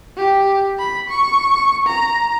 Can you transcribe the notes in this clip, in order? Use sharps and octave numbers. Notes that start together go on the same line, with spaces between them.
G4
B5
C#6
A#5